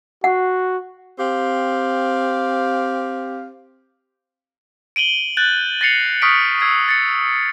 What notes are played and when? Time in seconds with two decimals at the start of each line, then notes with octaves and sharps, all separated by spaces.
0.24 F#4 F#5
1.19 C4 G4 F5
4.96 D7 D#7 F#7 G7
5.37 F#6 G6 A6 F#7
5.81 A6 A#6 C7 C#7 F7
6.22 C#6 D#6 F6 B6 D7
6.60 E6 G#6 C7
6.89 A6 C#7